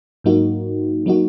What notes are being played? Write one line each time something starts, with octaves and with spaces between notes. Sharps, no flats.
G#2 F#3 A#3 D#4 F#4
F#3 A#3 D#4 F#4